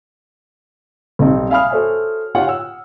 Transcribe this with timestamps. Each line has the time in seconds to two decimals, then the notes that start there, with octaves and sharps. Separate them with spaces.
1.19 B1 G3 C4 D#4
1.50 E5 F5 G#5 B5 D#6 F6
1.70 F#4 A4 C5 C#5 E5 G#5
2.35 D#4 F4 G4 C#5 F#5 G5
2.48 F#5 E6